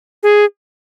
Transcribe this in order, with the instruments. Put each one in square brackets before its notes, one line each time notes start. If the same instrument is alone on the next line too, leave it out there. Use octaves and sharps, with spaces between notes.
[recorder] G#4